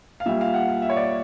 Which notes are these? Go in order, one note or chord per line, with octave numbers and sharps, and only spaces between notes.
F5
A#2 G3 E5
F5
F#5
F5
E5
C#5
D5